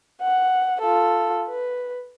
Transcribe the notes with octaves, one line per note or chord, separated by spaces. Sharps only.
F#5
F4 A4
B4